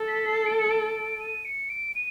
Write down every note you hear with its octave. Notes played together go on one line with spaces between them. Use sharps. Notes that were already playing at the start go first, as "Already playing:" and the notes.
Already playing: A4
B6
C7
D7
C#7
D7
D#7
C#7
D7
D#7